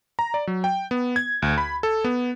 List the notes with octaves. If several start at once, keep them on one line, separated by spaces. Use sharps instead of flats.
A#5
D5
F#3
G5
B3
G#6
D2
B5
A4
B3